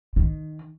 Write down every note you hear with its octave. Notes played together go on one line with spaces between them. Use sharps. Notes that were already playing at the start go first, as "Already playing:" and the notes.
D#3